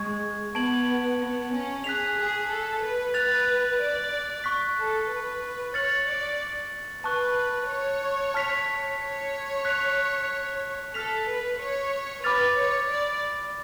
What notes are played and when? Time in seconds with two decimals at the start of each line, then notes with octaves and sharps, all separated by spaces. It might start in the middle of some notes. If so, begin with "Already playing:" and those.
Already playing: G#3 C#6 G#6
0.54 B3 A5 C#6 G#6 D7 F#7
1.20 B3
1.52 C#4
1.84 G#4 F#6 B6 F7
2.17 G#4
2.49 A4
2.82 B4
3.14 B4 F#6 A6 F7
3.80 D5
4.44 C#6 F#6 B6
4.77 A4
5.10 B4
5.74 C#5 F6 A6 C#7 F#7
6.08 D5
7.04 B4 A5 C#6 F#6
7.69 C#5
8.34 A5 F6 B6 F7
9.00 C#5
9.65 F#6 B6 F7
10.94 A4 F6 B6 F7
11.27 B4
11.59 C#5
12.24 B4 B5 D6 F6 A6 F7
12.56 C#5
12.90 D5